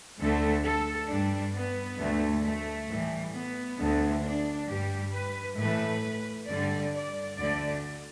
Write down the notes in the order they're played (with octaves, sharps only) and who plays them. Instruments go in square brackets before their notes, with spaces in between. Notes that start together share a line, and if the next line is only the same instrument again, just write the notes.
[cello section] D2 D3 A3 A4
A4
G2 G3 D4
B3
D2 D3 A3
A3
A2 E3 G3
B3
D2 D3 A3
D4
G2 G3 G4
B4
A2 E3 A3 B4
G2 D3 G3 D5
D5
D2 D3 A3 D5